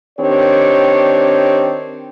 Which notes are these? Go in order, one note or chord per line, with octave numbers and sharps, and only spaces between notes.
D#3 C4 D4 G4 C#5